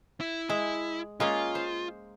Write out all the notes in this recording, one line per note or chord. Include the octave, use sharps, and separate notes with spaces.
E4
G#3 E4
G#3 A#3 C#4 F4
C5